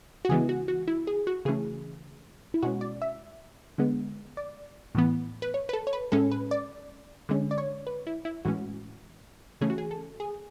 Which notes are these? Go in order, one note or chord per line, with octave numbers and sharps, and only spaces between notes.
F#4
C#3 E3 G#3 B3 G#4
F#4
F#4
E4
G#4
F#4
C#3 E3 A3 C#4 G#4
E4
B2 G#3 C#4 F#4
D5
E5
D3 G#3 B3
D5
A2 E3 B3
B4
C#5
B4
A4
C#5
B4
A2 G#3 C#4 A4
B4
D5
D3 G#3 C#4
D5
C#5
B4
E4
E4
A2 E3 G#3 C#4 F#4
C#3 E3 A3 C#4 G#4
F#4
G#4
A4
G#4